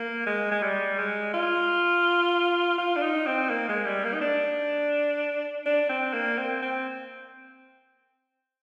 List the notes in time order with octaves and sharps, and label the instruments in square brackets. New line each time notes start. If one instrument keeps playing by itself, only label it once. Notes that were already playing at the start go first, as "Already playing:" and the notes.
Already playing: [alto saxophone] A#3
G#3
G#3
G3
G#3
F4
F4
D4
D#4
C4
A#3
G#3
G3
A#3
D#4
D4
D4
C4
A#3
C4
C4